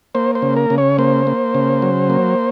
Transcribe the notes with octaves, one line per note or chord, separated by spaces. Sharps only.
A#3 C5
C5
C#3
A#4
C#3
C#5
A#3 C5
A#3
C#3
F#3
A#3